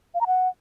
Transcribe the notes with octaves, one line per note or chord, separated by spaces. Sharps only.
F5
A#5
F#5